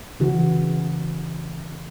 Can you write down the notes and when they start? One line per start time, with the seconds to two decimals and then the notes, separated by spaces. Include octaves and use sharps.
0.20 C#3 E3 F#4